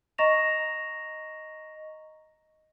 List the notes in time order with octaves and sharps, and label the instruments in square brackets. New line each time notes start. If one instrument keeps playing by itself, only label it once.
[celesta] D#5 A#5 C#6 A#6 E7 F7